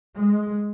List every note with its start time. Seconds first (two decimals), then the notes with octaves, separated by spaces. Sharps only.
0.16 G#3